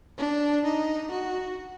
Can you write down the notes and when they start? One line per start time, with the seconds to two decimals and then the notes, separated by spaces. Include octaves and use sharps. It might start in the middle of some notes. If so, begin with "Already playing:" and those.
0.18 D4
0.65 D#4
1.11 F#4